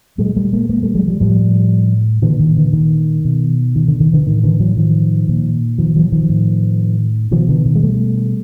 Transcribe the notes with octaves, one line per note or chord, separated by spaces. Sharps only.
A#2 F#3 G#3
G3 A3
G#3 A#3
G#3 A#3
G3 A3
F#3 G#3
F3 G3
A2 F3 G3
A#2 D3 E3
D#3
D3 E3
D#3
B2
D#3
D3
D#3
D3 E3
A2 D#3
D3 E3
E3 F#3
D#3 F3
A#2
D#3 F3
E3 F#3
D#3 F3
A2
B2 D#3 F3
D3 E3
D#3
G#3
G3 A3